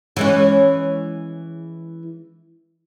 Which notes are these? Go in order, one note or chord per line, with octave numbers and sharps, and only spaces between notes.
E3 G#3 C#4